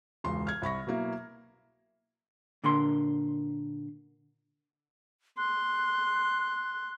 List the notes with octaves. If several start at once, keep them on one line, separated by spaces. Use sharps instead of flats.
E1 C#2 C6
F6 G#6
C2 B5 C#6 A#6
B2 F#3 A#3 E4
A#2 D3 A#4 C6
C6 F#6